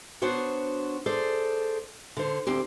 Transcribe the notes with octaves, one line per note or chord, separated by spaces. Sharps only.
B3 D4 F#4 C5 C#5
G#4 A4 C5 D5
D3 C5
D2 C4 G4